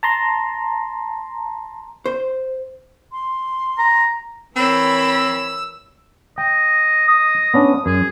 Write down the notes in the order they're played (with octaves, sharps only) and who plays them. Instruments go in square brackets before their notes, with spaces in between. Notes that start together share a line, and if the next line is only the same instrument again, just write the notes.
[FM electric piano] A5 A#5 C6
[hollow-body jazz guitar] C5
[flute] C6
[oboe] A#5
[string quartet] E3 A#4 C#5 [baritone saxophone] C4 [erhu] B5 [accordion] E6
[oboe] D#5 [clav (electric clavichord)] G5
[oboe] D#5 [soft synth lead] D#6
[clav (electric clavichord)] B3 C#4 D4
[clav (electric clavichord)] F#2 [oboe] G#4